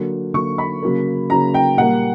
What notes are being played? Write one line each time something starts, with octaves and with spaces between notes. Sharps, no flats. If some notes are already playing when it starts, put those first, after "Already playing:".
Already playing: D3 F#3 A#3
D3 F#3 A#3 C#6
B5
C#3 F#3 A#3
C#3 F#3 A#3 A#5
G5
A#2 G3 A#3 F#5